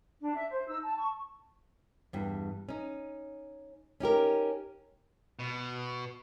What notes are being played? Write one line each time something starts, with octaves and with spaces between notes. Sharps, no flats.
D4
E5
C5
D#4 E6
A5
C#6
E2 G2
C#4 D#4
C#4 D#4 G4 A#4
B2